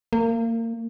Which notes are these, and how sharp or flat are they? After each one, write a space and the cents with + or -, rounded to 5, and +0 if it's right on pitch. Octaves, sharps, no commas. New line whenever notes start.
A#3 -30